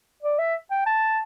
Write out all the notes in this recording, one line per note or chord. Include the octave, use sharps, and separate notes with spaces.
D5
E5
G5
A5